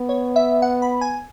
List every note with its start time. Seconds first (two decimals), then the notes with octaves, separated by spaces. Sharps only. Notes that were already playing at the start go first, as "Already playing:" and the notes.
Already playing: B3
0.09 C#5
0.36 E5
0.62 F#5
0.82 B5
1.01 G#5